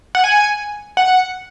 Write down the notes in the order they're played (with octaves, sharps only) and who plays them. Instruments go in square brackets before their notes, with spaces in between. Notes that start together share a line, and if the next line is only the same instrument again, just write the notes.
[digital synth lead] F#5
G#5
F#5